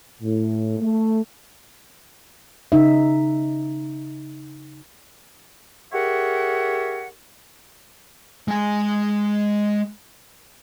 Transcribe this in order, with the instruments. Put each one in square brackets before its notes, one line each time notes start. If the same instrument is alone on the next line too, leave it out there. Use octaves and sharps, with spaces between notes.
[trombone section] A2
A3
[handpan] C#3 D#4 E5
[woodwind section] G4 G#4 A#4 C#5 E5 F#5
[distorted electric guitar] G#3 G#5